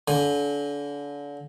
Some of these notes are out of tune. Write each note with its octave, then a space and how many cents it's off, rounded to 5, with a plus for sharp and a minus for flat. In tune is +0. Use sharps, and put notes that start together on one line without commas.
D3 -35 G#5 -10